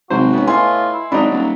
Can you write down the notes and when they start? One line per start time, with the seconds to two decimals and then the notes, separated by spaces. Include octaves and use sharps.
0.10 G#1 C3 F#3 F#4 C5
0.33 B3 C#4 B4
0.47 A2 F4 D#5 G#5 C6
0.93 E4
1.12 G#1 F#3 D4 D#4 B5
1.31 D#1